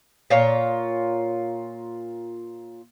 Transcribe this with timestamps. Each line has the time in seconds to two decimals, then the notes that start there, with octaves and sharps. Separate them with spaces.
0.30 A#2 F4 C#5